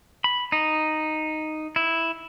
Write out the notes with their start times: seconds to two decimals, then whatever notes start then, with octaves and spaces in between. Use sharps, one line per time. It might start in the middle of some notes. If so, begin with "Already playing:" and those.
0.24 B5
0.52 D#4
1.76 E4